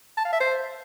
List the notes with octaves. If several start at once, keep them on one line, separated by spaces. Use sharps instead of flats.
A5
F5
E5
C5